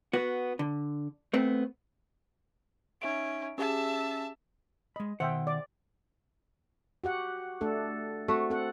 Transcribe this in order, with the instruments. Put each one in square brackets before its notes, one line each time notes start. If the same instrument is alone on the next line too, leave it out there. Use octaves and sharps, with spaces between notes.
[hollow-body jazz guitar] B3 F#4
D3
A3 B3 C4
[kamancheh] C#4 [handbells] D#4 E5 D7
[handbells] C#4 G4 G#4 [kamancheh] E5 A5
[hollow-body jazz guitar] G#3 B5 [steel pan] D#5
[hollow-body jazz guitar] B2 D#3 F#5 [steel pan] C5 E5 G5
[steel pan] D5 D6
[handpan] F#4 G4 F#5
A3 D4 A4
[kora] A3 F#4 [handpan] C4
[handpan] C4 A4 F#5